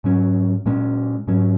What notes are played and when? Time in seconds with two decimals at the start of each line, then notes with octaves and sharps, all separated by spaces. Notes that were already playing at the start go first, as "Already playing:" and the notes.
0.04 G#2 F#3 C#4
0.66 A#2 G#3 C#4
1.28 G#2 F#3 C#4